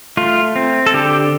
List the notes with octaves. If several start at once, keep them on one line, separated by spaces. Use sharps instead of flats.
A3 F4
C4
A4
D3 G4